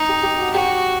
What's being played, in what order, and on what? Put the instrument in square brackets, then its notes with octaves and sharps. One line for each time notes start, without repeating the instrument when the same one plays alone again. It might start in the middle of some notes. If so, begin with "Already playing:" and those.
Already playing: [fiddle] D#4 [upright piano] D#5
[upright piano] G4
G4
F#4
[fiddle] F#4 [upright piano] G4